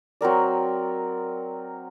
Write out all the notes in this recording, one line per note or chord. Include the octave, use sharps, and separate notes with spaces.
F#3 C4 A#4 D5